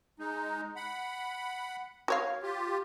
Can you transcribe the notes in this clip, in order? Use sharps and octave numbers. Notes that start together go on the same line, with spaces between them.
G#3 D#4
F#5 B5
F#4 C#5 F5
F4 G4